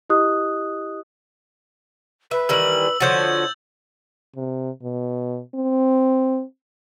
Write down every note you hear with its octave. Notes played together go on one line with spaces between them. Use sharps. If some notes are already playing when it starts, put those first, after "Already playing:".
E4 G4 D#5 D#6 F#6
B4 E5
D#3 E3 G3 E6 F#7
D3 F3 F#4 C#5 G6 A6
C3
B2
C4